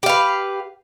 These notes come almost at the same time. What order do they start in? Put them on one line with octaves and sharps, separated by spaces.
G4 F5 B4